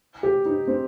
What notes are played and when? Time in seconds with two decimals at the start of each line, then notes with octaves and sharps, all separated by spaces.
0.23 G4
0.46 D#4
0.67 C4